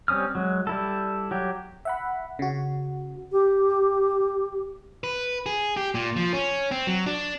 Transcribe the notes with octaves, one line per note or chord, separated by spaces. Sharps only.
G3 C4 C#4 D#6 F6
F#3 G#3
G3 E4 A4
F#3 G4
E5 F#5 B5
C#3 F#4
G4
B4
G#4
G4
A#2
F3
C#4
C4
F#3
D4